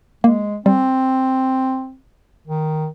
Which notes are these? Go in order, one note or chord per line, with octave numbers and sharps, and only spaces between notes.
G#3 A#3
G3 C4
D#3